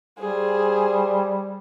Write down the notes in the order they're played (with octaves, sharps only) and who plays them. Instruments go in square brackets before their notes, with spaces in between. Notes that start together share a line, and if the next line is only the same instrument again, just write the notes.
[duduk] G3 [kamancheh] G#4 C5